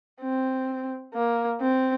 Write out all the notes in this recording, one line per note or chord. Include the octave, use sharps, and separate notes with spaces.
C4
A#3
C4